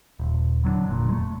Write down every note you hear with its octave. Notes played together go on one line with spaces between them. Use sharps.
D#1
D3 F#3 A#3 D4
F1 A#2
G#3 A3